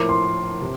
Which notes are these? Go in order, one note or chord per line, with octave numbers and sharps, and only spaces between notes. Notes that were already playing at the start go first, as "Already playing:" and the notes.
Already playing: A2 F3 A#3 E4 A#4 D6
C6
C3